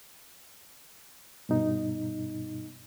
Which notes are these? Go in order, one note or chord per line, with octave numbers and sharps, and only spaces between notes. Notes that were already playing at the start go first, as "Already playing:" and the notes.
G2 B2 D#4